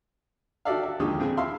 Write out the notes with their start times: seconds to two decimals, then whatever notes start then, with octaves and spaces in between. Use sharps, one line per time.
0.65 F#4 G4 A4 D5 E5 F5
0.83 E5
1.00 D#2 D3 F3 G#3 G4 D#6
1.19 A#1 C4 G#4 G#5
1.37 E4 E5 F5 C6